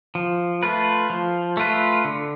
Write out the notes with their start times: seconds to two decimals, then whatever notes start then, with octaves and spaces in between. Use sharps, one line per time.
0.15 F3
0.63 A3 F4 B4
1.10 F3
1.57 A3 F4 B4
2.05 D3